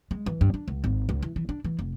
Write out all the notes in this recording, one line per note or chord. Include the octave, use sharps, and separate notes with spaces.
G#3
E3
G2
D4
C#2
G#1
C#2
E3
E3
D4
E3
F1